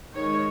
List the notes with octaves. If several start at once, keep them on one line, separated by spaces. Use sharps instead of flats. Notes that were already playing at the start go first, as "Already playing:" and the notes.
D#3 G#3 D#4 C#5